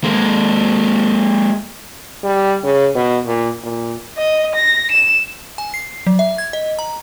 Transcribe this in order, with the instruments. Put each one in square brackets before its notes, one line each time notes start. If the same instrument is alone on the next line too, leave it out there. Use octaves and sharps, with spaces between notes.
[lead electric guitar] G#3 A#3
[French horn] G3
C#3
B2
A#2
A#2
[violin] D#5
A#6
E7
[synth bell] G#5
C7
F#3
E5
G#6
D#5
A#5